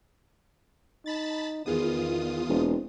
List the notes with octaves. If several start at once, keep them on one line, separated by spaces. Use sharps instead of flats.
D#4 A5 B5 A6
E2 D#3 B3 F4 G#4 D#6
E1 C4